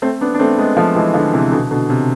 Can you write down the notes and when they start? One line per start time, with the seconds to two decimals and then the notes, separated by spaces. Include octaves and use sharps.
0.02 A3 C4
0.21 B3 D4
0.34 D4
0.39 A3 C4
0.58 G#3 B3
0.77 F3 A3
0.96 E3 G#3
1.14 D3 F3
1.33 C3 E3
1.52 B2 D3
1.71 B2 D3
1.90 C3